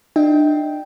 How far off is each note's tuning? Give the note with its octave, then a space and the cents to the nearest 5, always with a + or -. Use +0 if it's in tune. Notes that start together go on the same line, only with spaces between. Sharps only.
D4 +35 D#5 +40 G5 +0